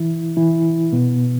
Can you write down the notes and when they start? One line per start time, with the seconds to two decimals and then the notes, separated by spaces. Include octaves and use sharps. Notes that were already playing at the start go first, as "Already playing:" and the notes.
Already playing: E3 E4
0.37 E3 E4
0.93 B2 B3